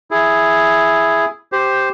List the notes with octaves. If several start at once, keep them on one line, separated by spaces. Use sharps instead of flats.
E4 G#4
G4 C5